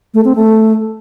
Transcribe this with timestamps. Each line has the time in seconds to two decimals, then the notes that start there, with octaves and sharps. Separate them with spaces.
0.14 A3
0.25 C4
0.36 A3